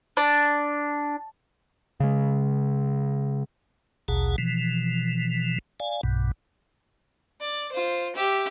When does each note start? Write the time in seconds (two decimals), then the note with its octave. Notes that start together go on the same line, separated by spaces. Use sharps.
0.17 D4
2.00 C#3 G#3
4.08 A#1 D#2 B2 G#4 F#5 A5
4.38 B2 E3 F3
5.80 D5 F5 G#5
6.03 B1 G2 B2
7.41 D5
7.72 F4 C5
8.16 G4 E5